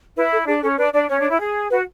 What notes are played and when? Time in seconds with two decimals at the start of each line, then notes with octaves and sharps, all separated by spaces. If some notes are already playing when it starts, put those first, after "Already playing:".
0.17 E4 B4
0.32 A4
0.47 D4 G#4
0.63 C#4 A4
0.78 D4 B4
0.93 D4 D5
1.09 C#4 C#5
1.19 D4
1.30 E4
1.40 G#4
1.70 F#4 B4